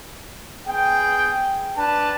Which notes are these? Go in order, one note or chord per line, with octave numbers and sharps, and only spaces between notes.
B3 G#4 G5
D4 B4 A5